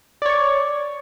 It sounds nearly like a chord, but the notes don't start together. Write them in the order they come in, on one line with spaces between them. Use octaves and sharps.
D5 C#5 C#6